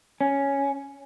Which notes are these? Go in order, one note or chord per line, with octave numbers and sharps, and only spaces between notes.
C#4